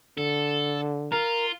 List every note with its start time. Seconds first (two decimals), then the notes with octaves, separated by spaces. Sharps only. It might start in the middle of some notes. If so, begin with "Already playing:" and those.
0.18 D3 A4
1.12 F4 A#4